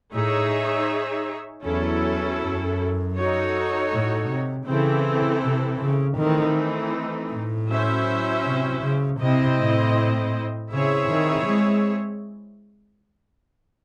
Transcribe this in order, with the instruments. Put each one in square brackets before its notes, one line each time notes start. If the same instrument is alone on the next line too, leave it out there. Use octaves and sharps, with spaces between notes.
[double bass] A2 [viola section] D#4 G#4 C#5 E5
[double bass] E2 [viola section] F#3 C#4 E4 A4
[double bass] F#2
[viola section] D#4 F#4 A4 C#5
[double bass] A2
C3
[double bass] C#3 [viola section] E3 C4 E4 A4
[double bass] C3
C#3
[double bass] D#3 [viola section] E3 A3 C4 D#4
[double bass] A2
[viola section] F#3 C#4 E4 C5 E5
[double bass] C3
C#3
[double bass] C3 [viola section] C4 E4 C5 D#5
[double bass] A2
[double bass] C#3 [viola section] C4 E4 G#4 C#5 E5
[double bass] D#3
G#3